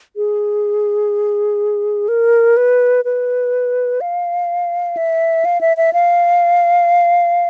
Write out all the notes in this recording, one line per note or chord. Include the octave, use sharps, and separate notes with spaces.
G#4
A#4
B4
B4
F5
E5
F5
E5
E5
F5